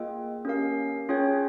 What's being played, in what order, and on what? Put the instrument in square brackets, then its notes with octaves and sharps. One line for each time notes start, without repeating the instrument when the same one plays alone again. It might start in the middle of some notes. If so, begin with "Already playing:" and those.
Already playing: [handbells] A#3 F4 G#4 D#5 G5
A#3 C#4 G4 A#4 F5
C#4 F4 G#4 C#5 G5